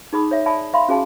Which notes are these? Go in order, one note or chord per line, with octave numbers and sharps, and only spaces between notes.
D#4 G#4 B5 D#6
C#5 E5
D5 E5 G#5 A5 B5 D#6
E5 F5 B5 C6
C#4 F#4 G#4 F5 G#5 A5